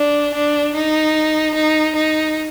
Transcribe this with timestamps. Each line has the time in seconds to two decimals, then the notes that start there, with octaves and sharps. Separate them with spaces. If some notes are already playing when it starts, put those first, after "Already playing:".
Already playing: D4
0.34 D4
0.75 D#4
1.54 D#4
1.95 D#4